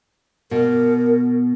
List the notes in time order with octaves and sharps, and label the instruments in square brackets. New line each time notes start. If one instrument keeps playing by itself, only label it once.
[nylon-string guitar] B2 [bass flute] A#4